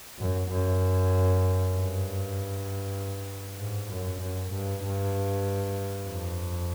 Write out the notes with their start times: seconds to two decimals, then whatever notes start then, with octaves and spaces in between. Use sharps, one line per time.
0.19 F#2
0.50 F#2
1.74 G2
3.58 G#2
3.90 F#2
4.20 F#2
4.52 G2
4.83 G2
6.06 F2